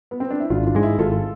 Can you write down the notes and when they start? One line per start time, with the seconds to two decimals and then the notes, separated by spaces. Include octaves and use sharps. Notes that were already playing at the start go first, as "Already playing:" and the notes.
0.11 B3
0.20 C4
0.30 D4
0.40 E4
0.50 G#1 D4 F4
0.66 D4 F4
0.75 G#2 G#3
0.83 E4 G#4
0.99 G#1 F4 A4